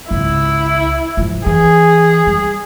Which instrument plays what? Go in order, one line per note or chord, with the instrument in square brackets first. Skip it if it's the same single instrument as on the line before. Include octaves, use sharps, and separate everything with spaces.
[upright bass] G#1 C#2 [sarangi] E4
[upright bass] G#2 F3
[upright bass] E3 [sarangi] G#4
[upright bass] G3